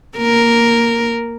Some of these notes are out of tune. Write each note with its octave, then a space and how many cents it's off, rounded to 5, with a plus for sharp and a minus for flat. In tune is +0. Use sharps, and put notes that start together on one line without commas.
A#3 +0 A#4 +0